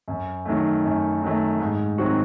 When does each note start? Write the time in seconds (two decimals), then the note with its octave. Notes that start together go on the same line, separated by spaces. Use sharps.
0.08 F#2
0.46 D#3 F#3 A3
0.84 F#2
1.22 D#3 F#3 A3
1.60 G#2
1.98 D#3 F#3 C4 F#4